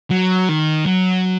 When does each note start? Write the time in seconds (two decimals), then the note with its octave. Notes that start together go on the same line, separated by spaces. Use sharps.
0.11 F#3
0.49 D#3
0.86 F#3